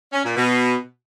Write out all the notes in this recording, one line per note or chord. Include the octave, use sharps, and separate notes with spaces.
C#4
A#2
B2